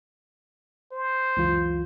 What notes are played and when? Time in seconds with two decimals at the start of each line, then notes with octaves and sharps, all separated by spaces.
0.92 C5
1.37 C#2 F#2 E3 F4